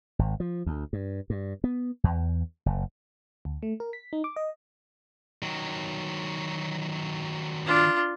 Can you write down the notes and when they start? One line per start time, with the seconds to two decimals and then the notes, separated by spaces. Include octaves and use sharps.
0.19 G#1
0.40 F3
0.66 D2
0.93 G2
1.30 G2
1.64 B3
2.04 E2
2.66 F#1
3.45 D2
3.63 A3
3.80 A#4
3.93 B6
4.13 D#4
4.24 D6
4.36 D#5
5.43 D#3 F#3
7.66 D4 F4